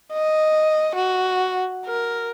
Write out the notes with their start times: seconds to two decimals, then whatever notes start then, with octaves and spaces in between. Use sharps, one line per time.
0.13 D#5
0.95 F#4
1.86 A#4